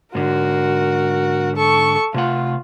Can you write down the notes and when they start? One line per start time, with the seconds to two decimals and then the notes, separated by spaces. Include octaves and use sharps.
0.15 G#2 D3 F#4 A#4
1.56 A4 C#6
2.14 C3 A3 F4 F#5